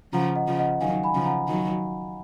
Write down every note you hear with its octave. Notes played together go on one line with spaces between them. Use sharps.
C#3 F3 F#5 A#5
D#5 F#5
C#3 F3
D#5 F#5
D#3 F#3 F5 G#5
G#5 B5
C#3 F3
F#5 A#5
D#3 F#3